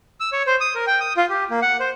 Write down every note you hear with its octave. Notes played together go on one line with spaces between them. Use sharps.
E6
C#5
C5
D#6
A#4
G5
D#6
F4
G4
A#3
F#5
C5